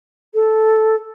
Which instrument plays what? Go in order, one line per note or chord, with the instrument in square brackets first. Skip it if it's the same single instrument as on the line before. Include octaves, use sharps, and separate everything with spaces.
[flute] A4